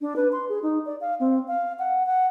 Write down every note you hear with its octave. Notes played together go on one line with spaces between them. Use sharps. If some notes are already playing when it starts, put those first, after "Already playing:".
D4
B4
C6
G#4
D#4
D5
F5
C4
F5
F#5
F#5